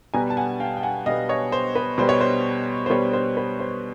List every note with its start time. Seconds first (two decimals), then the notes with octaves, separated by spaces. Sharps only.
0.14 B2 G3 B3 G#5 A#5
0.30 A5
0.37 F#5 G#5
0.60 F5 G5
0.77 G5
0.83 F#5 G#5
1.06 B2 G3 B3 D#5 F5
1.29 C#5 D#5
1.52 C5
1.75 B4
1.98 B2 G3 B3 C5
2.09 C#5
2.21 C5
2.86 C5
2.90 B2 G3 B3 B4 C#5
3.13 C5
3.37 B4
3.59 C5